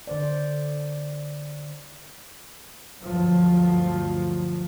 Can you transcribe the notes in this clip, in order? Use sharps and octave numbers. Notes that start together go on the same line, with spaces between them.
D3 C5 D5
D2 G2 F3 F#3